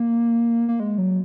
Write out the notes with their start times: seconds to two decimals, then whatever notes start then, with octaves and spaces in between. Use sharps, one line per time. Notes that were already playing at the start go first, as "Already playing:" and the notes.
Already playing: A#3
0.69 A#3
0.80 G#3
0.98 F#3